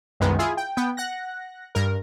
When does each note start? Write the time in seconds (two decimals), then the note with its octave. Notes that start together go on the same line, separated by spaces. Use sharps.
0.20 C2 F#2 D#3 G#3 B3
0.39 E4 F4 G#4
0.57 G5
0.77 B3 G5
0.97 F#5 F#6 A#6
1.75 G2 A#4